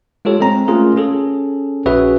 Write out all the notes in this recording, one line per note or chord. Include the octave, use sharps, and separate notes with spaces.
G#3 F4 G4 A4 C#5
G#3 C4 A#5
A3 C#4 F4 G#4 A#4
C#4 G#4 A4
A#1 C#4 F#4 G#4 B4 E5